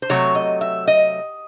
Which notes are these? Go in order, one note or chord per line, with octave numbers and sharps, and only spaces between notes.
C5
C3 F#3 A3 C#5
D#5
E5
D#5